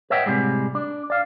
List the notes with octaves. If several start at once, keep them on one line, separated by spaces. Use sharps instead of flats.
B4 C#5 D#5 E5 F#5 G5
A2 C3 E3 G3 G#3
D4
D5 F5